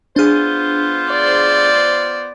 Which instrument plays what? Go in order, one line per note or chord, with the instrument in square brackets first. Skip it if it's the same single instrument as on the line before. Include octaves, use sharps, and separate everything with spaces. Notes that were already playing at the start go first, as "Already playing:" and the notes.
[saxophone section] B3 F4 C5 [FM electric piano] D4 G#4
[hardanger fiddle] D5